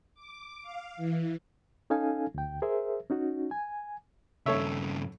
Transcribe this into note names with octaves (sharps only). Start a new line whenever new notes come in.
D6
F5
E3
C#4 D#4 A4 F5 G#5
D2 G5
G#4 A#4 C5 E5
C#4 D#4 F#4
G#5
G2 C#3 A4 C#5 E5